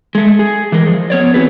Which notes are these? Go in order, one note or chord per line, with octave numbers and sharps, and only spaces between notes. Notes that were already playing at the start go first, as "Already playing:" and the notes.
G#3 A3
G#4
E3 G#3 A#4
F3
B3 C#5 D5
E2 D#3 C4 F#4 G#4 B4